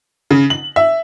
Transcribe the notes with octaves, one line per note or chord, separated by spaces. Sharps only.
C#3
F#7
E5